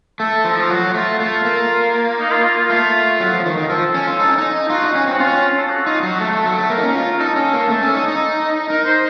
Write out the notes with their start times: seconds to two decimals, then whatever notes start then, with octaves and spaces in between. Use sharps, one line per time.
0.19 A3 A4
0.44 F3
0.50 D#4
0.60 F4
0.70 F#3 F#4
0.95 A3 F4
1.19 A3 F4
1.45 A#3
2.20 D#4
2.32 F4
2.44 F4
2.58 F4
2.70 A3 F4
3.20 F#3
3.33 F3
3.45 D#3
3.58 D#3
3.70 F3 A4
3.94 C#4
4.07 F4
4.20 D#4
4.29 C#4
4.38 D#4
4.70 F4 F#4
4.82 D#4
4.95 C#4
5.07 C4 F#4
5.20 C#4 F4
5.58 A4
5.70 F#4
5.86 D#4 F4
6.03 F#3 F#4
6.20 A3 A4
6.33 A3
6.46 F#3
6.58 A3
6.69 A#3 A#4
6.78 D#4
6.83 C#4
6.96 F4
7.13 A#4
7.20 D#4 A4
7.36 C#4
7.53 A#3
7.70 A3
7.82 C#4
7.95 D#4
8.08 D#4
8.70 D#4 A#4
8.86 C5